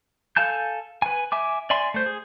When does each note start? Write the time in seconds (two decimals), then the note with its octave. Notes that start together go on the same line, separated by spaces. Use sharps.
0.36 A4 F5 G#5 A5 G6
1.02 B4 G#5
1.32 E5 G#5 D6
1.70 D5 E5 G#5 C6
1.94 A3 C5
2.06 G#4